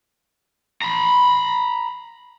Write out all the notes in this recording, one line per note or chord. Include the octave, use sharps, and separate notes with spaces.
A#5 B5